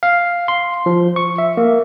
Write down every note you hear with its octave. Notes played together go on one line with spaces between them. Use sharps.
F5
C6
F3
C#6
E5
A#3